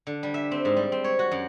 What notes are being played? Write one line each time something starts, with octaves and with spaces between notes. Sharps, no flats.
D3
G3
E5
C4
G#2
G3
C4
C#5
F#4
F#2